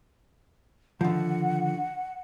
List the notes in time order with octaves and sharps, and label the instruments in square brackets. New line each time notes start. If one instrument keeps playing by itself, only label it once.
[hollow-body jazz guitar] D3 D#3 F3 [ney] F#5